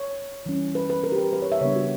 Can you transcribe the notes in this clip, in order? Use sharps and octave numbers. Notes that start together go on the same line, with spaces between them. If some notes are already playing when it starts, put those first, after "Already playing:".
Already playing: C#5
E3 G3 C#4
B4
B4
A#4
G4
A#4
B4
C#5
E5
C#3 G3 B3 D4 C#5
F#4